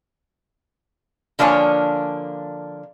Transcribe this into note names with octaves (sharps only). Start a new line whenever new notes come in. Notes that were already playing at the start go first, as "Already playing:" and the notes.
D3 F3 A#3 D4 C#5 G#5